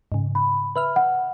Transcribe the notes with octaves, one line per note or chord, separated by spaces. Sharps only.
G#2 C#3
B5
B4 E5 B5 F6
F#5